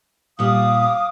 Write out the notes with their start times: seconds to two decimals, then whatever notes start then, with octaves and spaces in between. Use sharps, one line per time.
0.39 A#2 G3 F5 D6 D#6